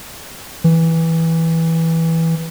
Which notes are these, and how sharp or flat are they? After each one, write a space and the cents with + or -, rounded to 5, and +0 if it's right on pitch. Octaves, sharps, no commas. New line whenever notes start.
E3 -10